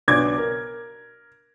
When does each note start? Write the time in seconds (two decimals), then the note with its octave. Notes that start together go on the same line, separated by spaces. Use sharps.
0.08 B1 B3 D4 D6 G#6
0.38 A#4